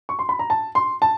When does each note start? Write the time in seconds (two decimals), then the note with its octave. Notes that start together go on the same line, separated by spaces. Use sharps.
0.09 C#6
0.19 C6
0.29 B5
0.39 A#5
0.50 A5
0.75 C6
1.02 A5